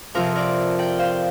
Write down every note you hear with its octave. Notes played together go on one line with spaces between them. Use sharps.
F2 C3 F3 F4 A#4
A#4 D5
D5 G5
C5 F5